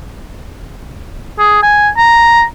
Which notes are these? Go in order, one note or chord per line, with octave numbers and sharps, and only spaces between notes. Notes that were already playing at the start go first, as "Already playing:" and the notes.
G#4
G#5
A#5